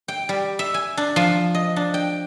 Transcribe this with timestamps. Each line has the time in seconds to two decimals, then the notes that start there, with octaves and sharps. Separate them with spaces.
0.08 G5
0.29 G3
0.59 E5
0.74 G#5
0.97 D4
1.16 F3
1.54 D#5
1.76 D4
1.94 G5